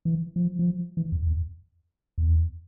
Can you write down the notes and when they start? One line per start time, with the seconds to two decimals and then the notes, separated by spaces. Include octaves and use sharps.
0.05 E3
0.36 F3
0.59 F3
0.97 E3
1.12 F2
1.27 E2
2.18 E2